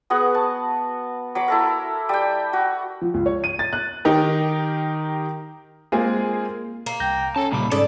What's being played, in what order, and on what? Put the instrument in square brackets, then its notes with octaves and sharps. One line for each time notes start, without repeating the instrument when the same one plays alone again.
[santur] B3 F#4 G#4 F#5
A5
F#3 B5 D6
E4 A4 A#4
G3 G5
F#4
[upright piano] F3
C#2
C#5
D#7
A6
F#6
D#3 D#4 G4 A#4
G#3 A#3 C4 F4 G#4
[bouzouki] A#3
[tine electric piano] C2 G6 A#6 [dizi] G5
[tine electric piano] C#4 [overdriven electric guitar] A4 A5 [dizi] C#5
[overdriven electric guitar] A#2 G3 [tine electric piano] C#3 [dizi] B5
[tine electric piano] G#2 C#4 G#4 [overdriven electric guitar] A4 [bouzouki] D5